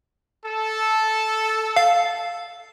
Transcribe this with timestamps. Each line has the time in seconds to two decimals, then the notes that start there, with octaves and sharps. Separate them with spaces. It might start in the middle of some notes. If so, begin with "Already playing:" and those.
0.46 A4
1.76 F5